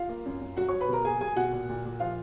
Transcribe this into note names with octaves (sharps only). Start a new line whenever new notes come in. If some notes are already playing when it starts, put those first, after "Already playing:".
Already playing: F4 F5
A#3
F#2
F#2
F#3 F#4 F#5
F#3 C#5 C#6
B4 B5
B2 A#4 A#5
A#3 G#4 G#5
F#3 G#4 G#5
B2 F#4 F#5
A#2
A#2
A#2
F3 F4 F5